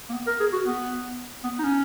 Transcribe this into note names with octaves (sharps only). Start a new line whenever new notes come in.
A#3
B3
A#4
G#4
F#4
B3
B3
D#4
C#4